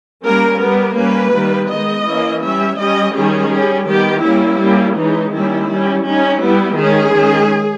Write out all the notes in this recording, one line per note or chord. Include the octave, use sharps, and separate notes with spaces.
G3 A#3 C#4 A#4
G3 B3 A#4
G3 A#3 C#4 B4
D#3 G3 A#3
D#3 G#3 B3 D#5
E3 A#3 C#4
G3 C#4 E5
G3 C#4 D#5
D#3 G3 C#4 G#4
G3 C#4
D#3 G3 B3 G4
G3 A#3 C#4 E4
G3 A#3 C#4
E3 G#3 C#4 D#4
D#3 G3 A#3 C#4 E4
G3 C#4
G3 C#4 D#4
G3 B3 E4
D#3 G#3 C#4 G#4
D#3 G#3 C#4